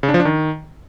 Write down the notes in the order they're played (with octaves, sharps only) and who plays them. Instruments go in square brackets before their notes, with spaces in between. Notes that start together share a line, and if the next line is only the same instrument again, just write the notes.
[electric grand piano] C#3
D4
F3
D4
D#3